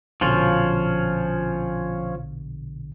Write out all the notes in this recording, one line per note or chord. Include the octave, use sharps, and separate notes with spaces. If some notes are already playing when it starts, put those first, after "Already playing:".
A#1 B2 D3 F3 C#4 F4